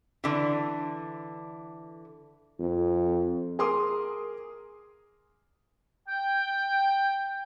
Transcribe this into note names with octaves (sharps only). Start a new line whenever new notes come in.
D3 E3
F2
G#4 A#4 C6 D6 D#6
G5